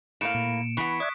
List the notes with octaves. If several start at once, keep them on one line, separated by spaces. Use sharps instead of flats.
A2 A#3 F5 C#7 D7 E7
A#2
E3 B3 C#6 B6
D5 E5 D#6 F#6 G#6